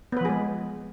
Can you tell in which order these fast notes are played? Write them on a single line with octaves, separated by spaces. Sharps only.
B3 B4 F3 G#4 G#3